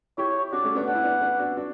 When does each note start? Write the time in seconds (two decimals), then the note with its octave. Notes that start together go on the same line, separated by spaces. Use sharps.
0.18 E4 G4 C#5
0.53 D4 F#4 D5
0.64 A3 C#4
0.75 B3 D4
0.87 D4 F#5
0.95 E4
1.04 B3 D4
1.22 B3 D4
1.39 D4 F#4
1.57 D4 F#4